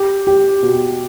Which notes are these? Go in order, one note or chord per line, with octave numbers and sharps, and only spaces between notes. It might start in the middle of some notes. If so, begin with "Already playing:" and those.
Already playing: G4
G4
B2